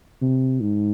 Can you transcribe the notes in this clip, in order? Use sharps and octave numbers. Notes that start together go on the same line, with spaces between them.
C3
G#2